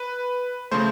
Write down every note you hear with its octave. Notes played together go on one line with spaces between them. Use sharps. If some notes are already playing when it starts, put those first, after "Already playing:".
Already playing: B4
C#3 F3 A3 C5